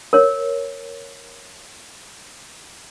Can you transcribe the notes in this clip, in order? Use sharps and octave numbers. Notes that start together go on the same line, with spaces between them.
A#4 C#5